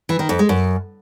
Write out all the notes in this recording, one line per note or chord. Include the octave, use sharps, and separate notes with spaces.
E3
D#3
F2
G#3
F#2